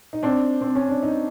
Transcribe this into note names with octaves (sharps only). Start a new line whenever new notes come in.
D#4
C4 D4
C4
C#4
D4
D#4